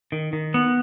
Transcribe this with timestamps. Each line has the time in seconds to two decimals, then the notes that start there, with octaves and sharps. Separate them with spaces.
0.12 D#3
0.33 D#3
0.54 B3